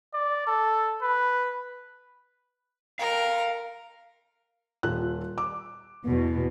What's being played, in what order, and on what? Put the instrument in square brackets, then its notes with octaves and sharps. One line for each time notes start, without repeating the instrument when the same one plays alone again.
[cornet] D5
A4
B4
[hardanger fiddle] A#4 [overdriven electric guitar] F5 G5
[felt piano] D#1 F4 F#6
D6
[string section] E2 B2